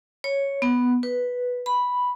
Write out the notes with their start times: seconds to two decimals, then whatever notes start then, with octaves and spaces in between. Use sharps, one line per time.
0.24 C#5
0.62 B3
1.03 B4
1.66 B5